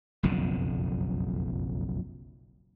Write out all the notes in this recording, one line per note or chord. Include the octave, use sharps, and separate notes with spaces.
F#1 B1 F2 D3